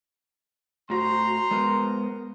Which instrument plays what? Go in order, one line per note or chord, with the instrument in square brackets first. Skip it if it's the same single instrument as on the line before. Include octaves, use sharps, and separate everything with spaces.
[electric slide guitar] A2 F#4 [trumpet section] C5 A#5 C6
[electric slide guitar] G#3 B3 A#4